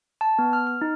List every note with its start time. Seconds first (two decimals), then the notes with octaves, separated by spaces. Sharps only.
0.21 A5
0.39 B3
0.53 F6
0.67 F6
0.81 D#4